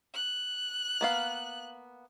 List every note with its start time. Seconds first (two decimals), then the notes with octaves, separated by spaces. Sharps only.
0.14 F#6
1.01 A#3 B3 F5